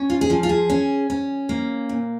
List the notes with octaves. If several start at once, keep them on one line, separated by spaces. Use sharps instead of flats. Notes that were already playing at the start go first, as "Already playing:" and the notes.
Already playing: C#4
F4
G#4
F3 F4
F4
G#4
C#4
C#4
A#3
A#2